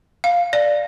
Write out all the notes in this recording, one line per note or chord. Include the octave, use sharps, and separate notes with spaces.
F5
D5